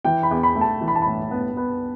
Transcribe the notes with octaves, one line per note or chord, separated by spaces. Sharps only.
E3 G5
B5
E2
B5
A3
A5
E3
B5
A5
A2 B5
B3
B3